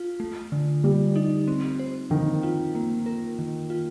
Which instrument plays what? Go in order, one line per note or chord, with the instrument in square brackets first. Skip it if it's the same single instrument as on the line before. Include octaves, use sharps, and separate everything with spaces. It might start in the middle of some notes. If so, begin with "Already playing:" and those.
Already playing: [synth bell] F4
A3
D3
[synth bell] D3 [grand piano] G3
[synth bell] D#4
C4
C5
[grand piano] D#3 [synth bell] F3
[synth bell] F4
A#3
A#4
D#3
F4